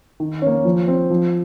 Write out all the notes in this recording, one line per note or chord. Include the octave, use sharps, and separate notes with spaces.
D#3
A#3 C#4
F3
C4
F3